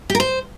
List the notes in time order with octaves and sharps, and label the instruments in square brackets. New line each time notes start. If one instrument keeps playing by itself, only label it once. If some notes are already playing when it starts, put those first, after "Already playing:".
[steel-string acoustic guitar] G4
A#4
C5